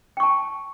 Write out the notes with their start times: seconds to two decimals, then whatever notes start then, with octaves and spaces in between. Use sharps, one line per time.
0.17 G5
0.20 C#6
0.23 A5